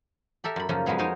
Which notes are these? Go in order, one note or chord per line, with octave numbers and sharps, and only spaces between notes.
G4 A4 A#4 E5
F#2 B5
F#2 C#3 F3 A#3
F2 G#3 A#3 B3 G#4
D#4 A#4 C5 C#5 G#5